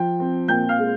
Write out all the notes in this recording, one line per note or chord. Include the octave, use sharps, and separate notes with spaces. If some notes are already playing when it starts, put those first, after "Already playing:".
Already playing: F3 G5
C4
A#2 G5 G6
F5 F6
G#3